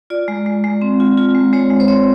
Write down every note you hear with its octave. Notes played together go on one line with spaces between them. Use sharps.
F4 D5
G#3
G#3
G#3
C4
F4
F4
G#3
G#3 C#5
G#3
C5
C4 C#5